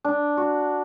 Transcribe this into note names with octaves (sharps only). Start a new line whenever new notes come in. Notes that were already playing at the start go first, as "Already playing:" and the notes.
D4
F#4